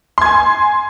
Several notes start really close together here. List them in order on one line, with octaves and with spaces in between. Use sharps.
C6 G#6 G#5